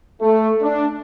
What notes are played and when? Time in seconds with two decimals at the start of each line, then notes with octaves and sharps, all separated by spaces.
0.21 A3
0.61 D4